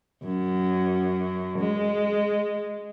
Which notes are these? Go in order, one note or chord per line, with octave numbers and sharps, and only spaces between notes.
F#2
G#3